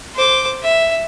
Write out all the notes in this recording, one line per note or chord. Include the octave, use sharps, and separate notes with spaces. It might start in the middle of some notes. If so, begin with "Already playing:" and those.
C5 D6
E5